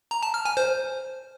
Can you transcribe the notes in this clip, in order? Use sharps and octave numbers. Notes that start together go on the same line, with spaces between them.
A#5
A5
F6
G#5
C5